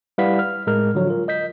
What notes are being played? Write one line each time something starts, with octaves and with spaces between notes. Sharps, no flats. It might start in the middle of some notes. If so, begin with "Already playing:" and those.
G3 E4 B4 F5 F#5 B6
F6
A2 G#3 A#4 F6
D3 F3 F#3
F4 A#4
D#5 G6 B6